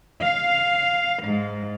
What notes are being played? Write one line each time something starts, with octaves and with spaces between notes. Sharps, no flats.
F5
G#2